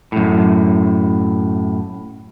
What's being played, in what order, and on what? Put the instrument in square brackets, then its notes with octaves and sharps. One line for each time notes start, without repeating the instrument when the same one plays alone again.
[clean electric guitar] F#2 A2